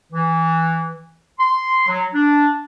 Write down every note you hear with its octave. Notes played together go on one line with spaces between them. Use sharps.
E3
C6
F#3
D4